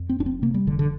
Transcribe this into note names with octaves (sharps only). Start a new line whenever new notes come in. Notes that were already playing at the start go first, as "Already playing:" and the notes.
Already playing: F2
C4
F1 D4
C4
C3 A#3
G3
F1 D3
D3